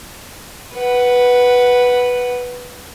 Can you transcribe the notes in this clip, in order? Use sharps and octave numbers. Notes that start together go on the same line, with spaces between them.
B4 F#5